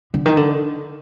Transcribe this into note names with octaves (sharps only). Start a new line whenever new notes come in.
D3
D#3
D3